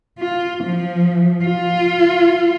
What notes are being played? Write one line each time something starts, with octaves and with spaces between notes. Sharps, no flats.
F4
F3
F4